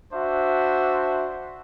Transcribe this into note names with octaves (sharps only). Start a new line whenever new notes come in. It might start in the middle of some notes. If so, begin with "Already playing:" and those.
D4 F#4 C5 E5